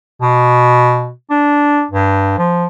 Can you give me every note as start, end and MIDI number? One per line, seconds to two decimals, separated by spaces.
0.22 1.10 47
1.30 1.84 62
1.91 2.33 43
2.38 2.67 53